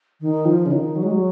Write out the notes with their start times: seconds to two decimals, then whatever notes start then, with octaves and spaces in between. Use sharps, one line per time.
0.21 D#3
0.45 F3
0.66 C#3
0.71 D#3
0.96 F#3
1.03 G#3
1.11 F#3